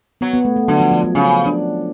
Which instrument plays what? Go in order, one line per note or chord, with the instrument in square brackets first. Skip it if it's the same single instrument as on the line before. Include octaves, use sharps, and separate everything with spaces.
[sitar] F#3 [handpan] B3
[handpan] B3
A3
A3
[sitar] D3 [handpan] F#3
[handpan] F3
F3
F#3
[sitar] C#3 [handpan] F#3
[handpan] D4